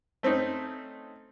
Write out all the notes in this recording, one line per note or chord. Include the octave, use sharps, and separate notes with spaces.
A3 C4 C#4 D#4